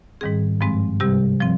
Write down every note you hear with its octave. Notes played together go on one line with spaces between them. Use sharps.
G#2 D#3 G3 C4 G#4
G2 F3 G#3 C4
C3 G3 C4 G4
F3 C4